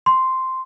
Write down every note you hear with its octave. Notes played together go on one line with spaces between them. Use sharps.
C6